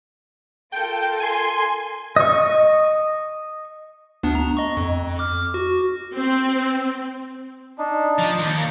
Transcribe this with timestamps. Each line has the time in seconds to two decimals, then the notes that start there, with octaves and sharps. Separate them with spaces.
0.72 F4 A4 A#4 G5
1.20 G#5 C6
2.16 D#5 C#6
4.23 D2 B3 D4
4.35 A#5
4.57 D#5 C#6
4.77 F2
5.19 D6 F6
5.54 F#4
6.16 C4
7.78 D4 D#4
8.19 F3
8.39 D#2 D#3
8.57 A#3